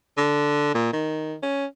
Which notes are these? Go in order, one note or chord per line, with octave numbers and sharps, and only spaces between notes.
D3
A#2
D#3
C#4